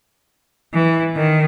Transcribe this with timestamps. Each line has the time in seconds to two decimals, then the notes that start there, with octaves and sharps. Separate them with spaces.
0.73 E3
1.15 D#3